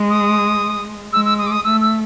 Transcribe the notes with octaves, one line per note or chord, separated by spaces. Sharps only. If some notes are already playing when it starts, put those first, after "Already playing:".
Already playing: G#3
D#6
G#3 E6
E6
D#6
D6
D#6
A3 E6
E6